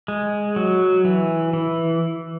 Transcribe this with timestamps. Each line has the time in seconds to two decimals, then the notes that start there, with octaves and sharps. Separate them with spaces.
0.08 G#3
0.56 F#3
1.05 E3
1.53 E3